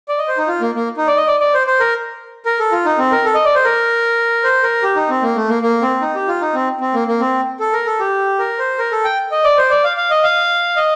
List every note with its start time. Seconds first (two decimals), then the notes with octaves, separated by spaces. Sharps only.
0.09 D5
0.19 D#5
0.28 C5
0.38 D#4
0.48 F4
0.61 A#3
0.75 A#3
0.97 D#4
1.07 D5
1.17 D#5
1.27 D5
1.40 D5
1.54 C5
1.67 C5
1.80 A#4
2.46 A#4
2.59 A4
2.72 F4
2.85 D#4
2.98 C4
3.12 A#4
3.25 A4
3.35 D#5
3.45 D5
3.55 C5
3.64 A#4
4.44 C5
4.63 A#4
4.83 G4
4.96 D#4
5.10 C4
5.23 A#3
5.36 A3
5.49 A#3
5.62 A#3
5.82 C4
6.01 D#4
6.15 G4
6.28 F4
6.41 D#4
6.55 C4
6.81 C4
6.94 A#3
7.07 A#3
7.20 C4
7.60 A4
7.73 A#4
7.86 A4
8.00 G4
8.39 A#4
8.59 C5
8.79 A#4
8.92 A4
9.05 G5
9.31 D#5
9.44 D5
9.58 C5
9.71 D5
9.84 F5
9.97 F5
10.11 D#5
10.24 F5
10.76 D#5